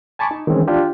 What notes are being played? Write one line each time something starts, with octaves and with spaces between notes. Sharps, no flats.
G#5 A5 B5 C#6 D6
D#4
D#3 E3 G#3 C4 C#4
D4 F4 G4